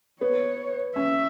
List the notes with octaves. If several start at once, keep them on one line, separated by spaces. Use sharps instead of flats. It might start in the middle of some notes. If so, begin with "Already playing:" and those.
B3 C#5
C#4 E5